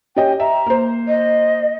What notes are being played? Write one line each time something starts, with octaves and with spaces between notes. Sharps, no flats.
C#4 G4 D#5 G5
E5 A#5
A#3 C5
D#5